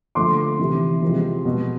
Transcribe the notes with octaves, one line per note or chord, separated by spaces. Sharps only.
D3 F3 A3 C6 D6
C3 E3 G3
C3 F3 G#3
B2 G#3